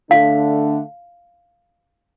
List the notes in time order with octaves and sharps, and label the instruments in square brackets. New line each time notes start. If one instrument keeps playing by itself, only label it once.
[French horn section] D3 A3 D4 [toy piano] F5